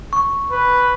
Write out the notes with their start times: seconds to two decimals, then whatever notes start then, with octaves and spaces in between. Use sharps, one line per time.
0.13 C#6
0.51 B4